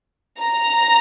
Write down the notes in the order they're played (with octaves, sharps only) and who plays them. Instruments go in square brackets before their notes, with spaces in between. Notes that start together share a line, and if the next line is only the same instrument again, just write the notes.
[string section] A#5